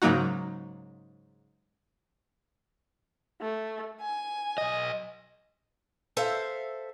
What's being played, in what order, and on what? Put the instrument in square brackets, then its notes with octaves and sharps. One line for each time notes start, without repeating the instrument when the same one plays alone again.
[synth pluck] G#2 C#3 F#3 A#3 D#4 F#4
[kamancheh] A3
G#5
[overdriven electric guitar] B1 D#5
[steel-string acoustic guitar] A4 C5 E5 F5